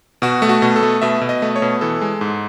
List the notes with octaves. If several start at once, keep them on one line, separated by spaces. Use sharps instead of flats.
B2 F#4
A3
F#4
B2
A4
A3
B2 E5
B2
D#5
A3
C#5
B2
E3 A4
G#3
G#2